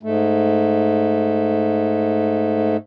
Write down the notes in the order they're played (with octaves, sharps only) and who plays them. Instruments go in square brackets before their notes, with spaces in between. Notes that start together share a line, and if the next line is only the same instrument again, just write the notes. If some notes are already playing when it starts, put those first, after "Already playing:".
[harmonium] G#2 A3